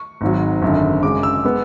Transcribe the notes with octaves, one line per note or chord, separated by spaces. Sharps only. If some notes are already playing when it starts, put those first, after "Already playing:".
Already playing: C#6
G#1 G#2 F#3
G#1 F#2 D3
F#2 C#3 G#3 D6
E6
G#3 B3